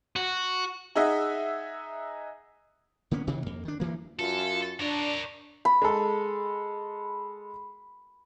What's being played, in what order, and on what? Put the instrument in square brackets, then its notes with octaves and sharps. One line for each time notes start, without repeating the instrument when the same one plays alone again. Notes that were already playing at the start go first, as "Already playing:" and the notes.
[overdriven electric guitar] F#4
[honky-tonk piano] D#4 G#4 D#5 E5 F#5
[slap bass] D3 A#3 B3 C#4
G2 C3 D#3 E3
F2 A#3
D#3 D4
G2 E3 A#3
[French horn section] F#2 F4 [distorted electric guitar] A4
[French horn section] D4 [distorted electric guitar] A#4 C#5
[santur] B5
[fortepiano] G#3 A4